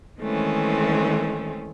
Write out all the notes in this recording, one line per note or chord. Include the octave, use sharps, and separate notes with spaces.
D#3 E3 G#3 A3 C4 C#4